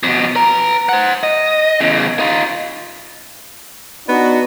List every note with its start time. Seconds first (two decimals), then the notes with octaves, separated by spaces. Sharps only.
0.03 F2 B2
0.35 B4 A#5
0.89 C5 F#5
1.23 D#5
1.80 E2 C#3
2.19 D#4 F4
4.08 B3 D4 D#4 F#4